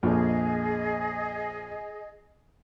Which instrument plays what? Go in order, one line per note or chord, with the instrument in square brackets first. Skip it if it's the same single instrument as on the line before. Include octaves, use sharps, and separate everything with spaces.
[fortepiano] A#1 F2 [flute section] G#4 D#5